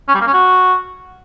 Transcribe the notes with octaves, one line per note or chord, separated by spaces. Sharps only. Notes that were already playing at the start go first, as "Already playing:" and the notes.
C#4
G3
A#3
C#4
F#4